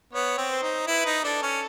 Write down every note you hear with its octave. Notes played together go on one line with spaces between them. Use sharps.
B3 C#5
C4
C5
D#4
E4 B4
D#4
D4 A4
C#4